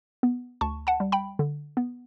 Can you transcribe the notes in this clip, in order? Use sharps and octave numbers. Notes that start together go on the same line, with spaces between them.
B3
D2 A5 C#6
F#5 A5
G3
G5 B5
D3
B3